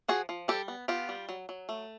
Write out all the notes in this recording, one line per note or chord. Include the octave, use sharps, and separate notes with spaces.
F3 F#4 G#4
F3
G3 G4 A4
B3
B3 F4 G4
G3
F#3
F#3
A3